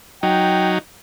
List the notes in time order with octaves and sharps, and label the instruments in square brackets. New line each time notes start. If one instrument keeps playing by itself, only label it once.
[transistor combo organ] F#3 D#4 [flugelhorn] G5